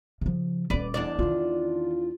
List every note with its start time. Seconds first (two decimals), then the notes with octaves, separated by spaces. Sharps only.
0.21 C#3 F3
0.70 D#1 C#4 B4 D5
0.94 E2 D4 D5
1.19 D#3 D#4 F4